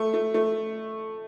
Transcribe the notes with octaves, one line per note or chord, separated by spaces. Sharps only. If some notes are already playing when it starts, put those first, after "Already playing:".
Already playing: A3
A3
A3